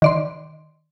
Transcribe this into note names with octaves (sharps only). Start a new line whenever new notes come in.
D#3 D5 C6